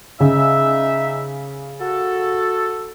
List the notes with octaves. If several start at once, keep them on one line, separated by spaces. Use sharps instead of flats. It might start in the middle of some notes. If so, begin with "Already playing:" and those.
C#3 D#4 E5
F#4 A4